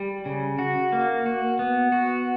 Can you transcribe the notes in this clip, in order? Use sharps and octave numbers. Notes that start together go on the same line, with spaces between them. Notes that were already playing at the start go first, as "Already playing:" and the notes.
Already playing: G3
C#3
F#4
A#3
F#4
B3
F#4